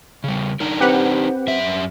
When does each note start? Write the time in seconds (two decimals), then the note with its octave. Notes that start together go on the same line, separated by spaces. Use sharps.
0.24 C#3 G3
0.60 D4 D#4 A#4
0.80 C4 G4 B4 F#5
1.47 F#2 C#4 E5